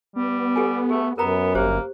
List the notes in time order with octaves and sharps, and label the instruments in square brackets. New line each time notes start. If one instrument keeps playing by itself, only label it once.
[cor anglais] G3 [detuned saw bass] B3
[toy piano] G4 A4 G#5
[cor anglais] A3 [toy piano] G#4
[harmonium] F#2 [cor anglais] B3 [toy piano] A#4 A#5
[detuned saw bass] G1 [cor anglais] A#3 [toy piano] G4 C5